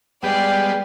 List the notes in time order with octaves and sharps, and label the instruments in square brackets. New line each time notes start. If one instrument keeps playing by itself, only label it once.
[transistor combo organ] G3 G#3 B3 [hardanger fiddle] D5 F5 [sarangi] G5